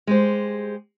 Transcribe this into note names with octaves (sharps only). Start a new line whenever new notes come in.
G#3 G4 C5